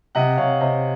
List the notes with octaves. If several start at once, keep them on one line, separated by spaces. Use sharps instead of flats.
C3 D#5 F#5
C3 C#5 F5
C3 C5 D#5